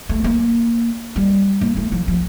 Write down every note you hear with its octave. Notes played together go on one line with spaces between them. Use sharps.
A3
A#3
G3
A#3
A3
F3
F3